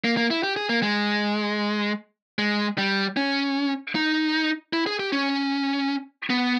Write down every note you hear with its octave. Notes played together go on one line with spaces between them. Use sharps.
A#3
A#3
E4
G4
G#4
A#3
G#3
G#3
G3
C#4
D#4
E4
G#4
G4
C#4
B3